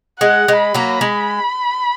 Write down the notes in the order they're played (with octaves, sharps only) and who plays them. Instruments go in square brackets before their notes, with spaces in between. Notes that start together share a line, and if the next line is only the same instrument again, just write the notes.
[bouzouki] G#3 [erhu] F#5
[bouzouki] G#3
[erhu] B5
[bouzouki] F#3 A#3
G#3